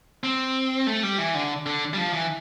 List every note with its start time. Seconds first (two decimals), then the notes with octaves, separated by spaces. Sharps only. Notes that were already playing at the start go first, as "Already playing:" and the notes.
0.24 C4
0.87 A3
1.03 G3
1.18 E3
1.35 D3
1.66 D3
1.94 G3
1.97 F3
2.14 E3